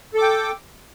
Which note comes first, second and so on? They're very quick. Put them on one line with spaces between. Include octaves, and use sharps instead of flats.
A4 D6 G5